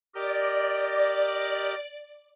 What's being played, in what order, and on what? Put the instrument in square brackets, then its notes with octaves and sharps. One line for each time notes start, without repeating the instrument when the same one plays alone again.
[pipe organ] G4 A#4 D#5 [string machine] D5